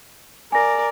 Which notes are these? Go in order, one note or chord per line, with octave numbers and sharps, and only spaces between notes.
A#4 D5 G#5 A#6